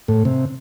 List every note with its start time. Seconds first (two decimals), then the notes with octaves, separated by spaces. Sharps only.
0.08 A2
0.25 C3